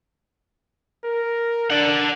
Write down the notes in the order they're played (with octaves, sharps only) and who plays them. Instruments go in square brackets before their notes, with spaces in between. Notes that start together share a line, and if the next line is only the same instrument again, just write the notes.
[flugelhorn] A#4
[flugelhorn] D4 [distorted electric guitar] D5 F#5